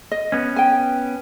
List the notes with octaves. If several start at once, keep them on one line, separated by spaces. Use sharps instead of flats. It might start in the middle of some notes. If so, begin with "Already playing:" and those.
D#5
B3 C#4
G5 G#5